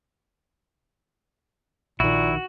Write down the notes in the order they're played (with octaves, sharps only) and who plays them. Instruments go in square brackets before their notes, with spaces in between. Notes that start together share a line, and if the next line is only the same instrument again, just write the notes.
[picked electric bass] A#1 D#3 [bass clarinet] A#2 [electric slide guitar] E4 [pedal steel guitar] F#4